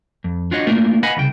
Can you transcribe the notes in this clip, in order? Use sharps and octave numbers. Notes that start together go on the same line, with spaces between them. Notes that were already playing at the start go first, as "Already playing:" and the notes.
F2
D4 F4 F#4 C#5 D#5
A3 A#3 D4 F4 A#4
B4 D#5 F5 F#5 G#5 B5
C2 C#3 G5